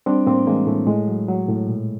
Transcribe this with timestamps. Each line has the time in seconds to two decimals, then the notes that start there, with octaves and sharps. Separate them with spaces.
0.06 G3 C4 D4
0.26 A2 A#3 C4
0.47 E3 G#3 A#3
0.67 A2 A3
0.87 A2 G#3
1.08 F#3
1.28 F#3
1.49 A2
1.68 A#2